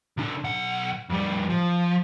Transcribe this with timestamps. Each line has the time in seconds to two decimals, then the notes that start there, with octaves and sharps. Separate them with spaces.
0.17 C3 D4
0.44 B1 F#5
1.09 F2 G3
1.50 F3